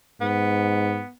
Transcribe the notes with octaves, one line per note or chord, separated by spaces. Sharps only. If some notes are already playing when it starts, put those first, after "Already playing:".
G#2 B3